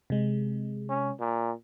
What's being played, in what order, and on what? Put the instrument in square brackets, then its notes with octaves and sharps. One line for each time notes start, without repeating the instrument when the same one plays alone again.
[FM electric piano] C3 G#3
[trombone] C#4
A#2